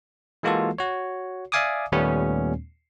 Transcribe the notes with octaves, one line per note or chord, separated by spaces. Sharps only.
E3 G#3 A#3 F4 F#4 A4
F#4 C#5
D5 E5 F5 G#5 D6 D#6
D#2 A#2 G3 A3 B3 C#4